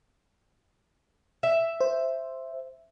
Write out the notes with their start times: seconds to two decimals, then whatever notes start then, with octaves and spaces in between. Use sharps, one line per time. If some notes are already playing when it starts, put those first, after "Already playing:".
1.43 E5
1.81 C5